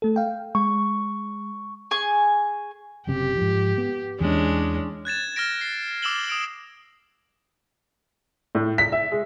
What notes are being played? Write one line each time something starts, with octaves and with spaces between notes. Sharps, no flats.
A3 A4
F5 G5
G#3 C#6
G#4 G#5 C#6
F#1 F#2 C3 G4
G#2 F3
B3
E2 E3 G#3 C#4 D4
F#6 G#6 A6 E7
F6 A6 A#6 D7
C7
D6 E6 C7 E7 F#7 G7
D#6 D7 F#7
A2
B6
E5
G#3